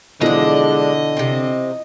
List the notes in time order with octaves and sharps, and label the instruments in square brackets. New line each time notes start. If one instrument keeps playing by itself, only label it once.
[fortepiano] B2 E3 F3 [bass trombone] D3 [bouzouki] G#3 D4 [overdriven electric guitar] D#5
[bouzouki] C3 C4